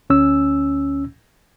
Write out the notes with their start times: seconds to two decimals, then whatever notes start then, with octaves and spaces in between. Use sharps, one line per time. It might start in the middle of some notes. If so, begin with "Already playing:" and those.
0.10 D2 C#4 E6